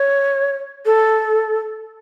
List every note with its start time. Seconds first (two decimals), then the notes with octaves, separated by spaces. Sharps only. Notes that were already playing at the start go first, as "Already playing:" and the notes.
Already playing: C#5
0.86 A4